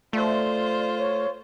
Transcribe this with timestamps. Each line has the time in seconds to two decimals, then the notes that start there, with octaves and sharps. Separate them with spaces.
0.13 A3 F4 C5 D5
0.97 C#5